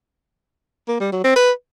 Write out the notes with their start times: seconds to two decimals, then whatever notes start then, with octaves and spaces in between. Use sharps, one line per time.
0.88 A#3
1.00 G3
1.12 F#3
1.24 C4
1.36 B4